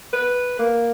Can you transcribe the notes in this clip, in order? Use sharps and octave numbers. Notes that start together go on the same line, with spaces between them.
B4
A#3